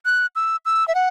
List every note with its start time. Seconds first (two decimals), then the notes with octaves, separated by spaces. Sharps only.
0.06 F#6
0.36 E6
0.66 E6
0.88 E5
0.95 F#5